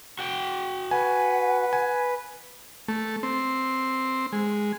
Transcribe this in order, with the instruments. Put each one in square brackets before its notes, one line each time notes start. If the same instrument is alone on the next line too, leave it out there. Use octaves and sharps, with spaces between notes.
[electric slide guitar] F#4 G5
[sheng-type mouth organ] B4 [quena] F#5 [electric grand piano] G#5
[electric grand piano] G#5
[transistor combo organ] A3
C4
G#3